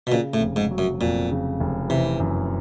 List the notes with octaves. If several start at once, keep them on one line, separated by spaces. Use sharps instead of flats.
B2
A#2 C#3
A2
F1
G#2
F#3
F#2
F2 A#2
C#3
F1
C3 E3
F#2